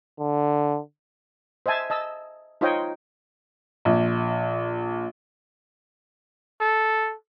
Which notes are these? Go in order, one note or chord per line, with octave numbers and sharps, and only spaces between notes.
D3
C5 D#5 E5 G#5 A5
D#5 A5 E6
D#4 F4 C5 C#5 D#5 G5
A#1
A4